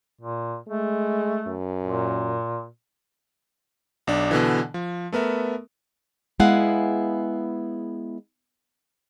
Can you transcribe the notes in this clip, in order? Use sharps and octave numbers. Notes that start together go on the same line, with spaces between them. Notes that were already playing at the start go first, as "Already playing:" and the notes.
A#2
G#3 A3
F#2
A#2
B1 D4
B2 D3 E3
F3
A3 B3 A#4 E5
G#3 B3 E4 G#4 F5 F#5